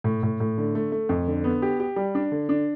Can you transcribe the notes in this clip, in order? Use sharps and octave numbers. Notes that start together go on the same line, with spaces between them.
A2
A2
A2
D3
A3
A3
F2
D3
B3
G4
G4
G3
D4
D3
D4